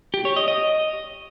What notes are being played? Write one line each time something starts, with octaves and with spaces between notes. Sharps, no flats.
G4
C#5
D#5
D#5